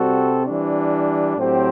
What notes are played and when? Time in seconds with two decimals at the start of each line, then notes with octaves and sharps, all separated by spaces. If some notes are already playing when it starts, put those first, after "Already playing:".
Already playing: C3 G3 C4 F#4 A4
0.46 E3 G3 D4
1.36 A2 F#3 C4 G4 C5